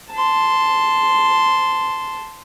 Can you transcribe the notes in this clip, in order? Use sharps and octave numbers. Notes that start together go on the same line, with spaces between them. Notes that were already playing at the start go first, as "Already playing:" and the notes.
A5 C6